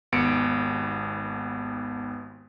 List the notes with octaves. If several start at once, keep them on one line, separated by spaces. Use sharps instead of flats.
G#1 D#2 B3 C#7 D7